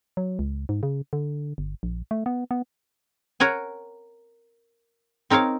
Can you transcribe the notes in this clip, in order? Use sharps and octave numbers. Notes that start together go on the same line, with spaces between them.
F#3
C#2
G#2
C#3
D3
G1
A#1
A3
B3
B3
A#4 C#5 F#5 G#5
C4 D#4 A#4 C#5 F5